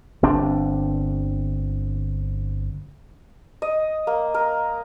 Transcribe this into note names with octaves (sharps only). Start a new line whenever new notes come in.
G1 C4 D4
D#5
A#3
A#4